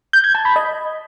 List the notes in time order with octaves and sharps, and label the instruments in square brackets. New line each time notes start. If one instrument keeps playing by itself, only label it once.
[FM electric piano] G6
G#6
A5
B5
D#5